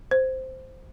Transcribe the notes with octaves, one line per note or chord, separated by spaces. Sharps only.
C5